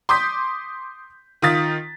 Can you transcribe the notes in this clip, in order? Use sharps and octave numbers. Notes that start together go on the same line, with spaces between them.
C6 D6 D#6 G6 B6
D#3 F4 D#6 A6 B6